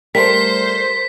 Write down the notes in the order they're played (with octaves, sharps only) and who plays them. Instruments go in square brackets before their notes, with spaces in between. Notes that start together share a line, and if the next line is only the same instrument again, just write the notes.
[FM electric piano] G3 A3 C6 [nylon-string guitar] A#4 [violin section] C5 [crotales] B6